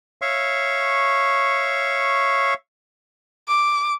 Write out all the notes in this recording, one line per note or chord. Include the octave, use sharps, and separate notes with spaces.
C#5 E5 F5 C#6
D6